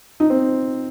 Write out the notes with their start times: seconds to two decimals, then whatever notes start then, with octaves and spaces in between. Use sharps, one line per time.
0.20 D#4
0.30 C4